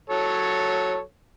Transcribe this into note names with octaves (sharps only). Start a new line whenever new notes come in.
F#3 A4 C#5